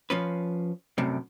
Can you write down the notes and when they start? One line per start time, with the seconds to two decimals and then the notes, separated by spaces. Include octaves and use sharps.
0.10 F3 C#4 B4
0.98 F#2 A2 C3 G3